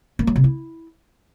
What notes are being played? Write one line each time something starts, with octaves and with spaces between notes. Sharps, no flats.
A#3
F#3
C3
E4